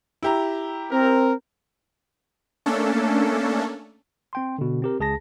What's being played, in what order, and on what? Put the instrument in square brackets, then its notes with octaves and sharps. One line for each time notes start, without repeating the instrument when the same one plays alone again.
[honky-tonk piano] E4 G4 A#5
[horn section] C4 A#4
[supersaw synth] A3 A#3 C#4 D4 A4
[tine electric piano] C4 G5 C6
B2 D3
C4 G4 A#4
C#2 G#4 A5 A#6